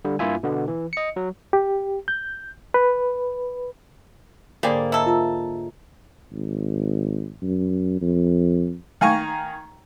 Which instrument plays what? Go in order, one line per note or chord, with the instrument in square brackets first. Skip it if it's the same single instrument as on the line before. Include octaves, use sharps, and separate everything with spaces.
[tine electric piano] D3 G3
G2 A#3 E4 F4 E5 G#5
B2 D3 B3
E3
D#5 C#7
F#3
[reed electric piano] G4
G6
B4
[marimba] G#2 C5 G5 [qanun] D3 A#3 [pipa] G3 G#4 D5
[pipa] E4 A4 [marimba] D#5 E5 A#5
[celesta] F4 [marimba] A#4 A5 A#5
[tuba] G#1
F#2
F2
[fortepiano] D#3 F5 G#5 A#5 C#6